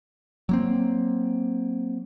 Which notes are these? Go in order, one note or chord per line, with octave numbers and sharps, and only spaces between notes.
F#3 A#3 C4